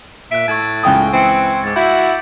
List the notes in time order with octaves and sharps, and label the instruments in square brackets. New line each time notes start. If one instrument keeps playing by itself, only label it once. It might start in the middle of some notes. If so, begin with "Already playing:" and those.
[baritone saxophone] A#2 [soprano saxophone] E5 [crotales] F#6 D7
[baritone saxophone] A2 [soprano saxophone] A5 [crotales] C#6 E6 G#6
[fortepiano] C#2 G5 D#6
[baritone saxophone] E3 [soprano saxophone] C4 [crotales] E6 C#7 D7
[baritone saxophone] G#2 [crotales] D6 A6
[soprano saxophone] E4 [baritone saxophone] F#4 [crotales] G6 B6